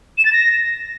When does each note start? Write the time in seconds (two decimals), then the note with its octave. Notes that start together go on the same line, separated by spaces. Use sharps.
0.18 E7
0.25 A6
0.33 A#6